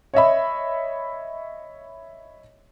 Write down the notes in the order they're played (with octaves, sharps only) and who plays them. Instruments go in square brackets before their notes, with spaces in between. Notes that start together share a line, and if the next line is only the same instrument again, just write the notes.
[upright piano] C#5 D#5 E5 B5